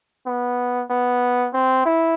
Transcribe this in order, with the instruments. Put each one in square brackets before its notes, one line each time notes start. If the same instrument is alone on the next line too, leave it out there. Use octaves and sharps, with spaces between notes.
[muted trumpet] B3
B3
C4
E4